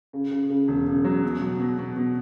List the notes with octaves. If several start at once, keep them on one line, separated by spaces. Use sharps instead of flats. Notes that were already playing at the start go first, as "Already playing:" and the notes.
C#3
C#3
C#3
E1
C#3
F#3
B2
F#3
B2
B2
B2